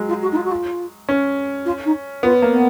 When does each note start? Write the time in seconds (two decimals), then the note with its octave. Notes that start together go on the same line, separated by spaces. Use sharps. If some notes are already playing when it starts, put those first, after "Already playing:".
Already playing: F#3 G#3
0.09 F4
0.22 F#4
0.32 D#4
0.36 F4
0.45 F#4
0.52 F4
1.09 C#4
1.66 F4
1.85 D#4
2.23 B3 F4
2.42 A#3
2.52 B3